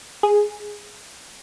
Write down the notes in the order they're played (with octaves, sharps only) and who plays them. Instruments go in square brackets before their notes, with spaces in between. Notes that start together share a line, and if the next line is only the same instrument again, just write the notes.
[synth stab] G#4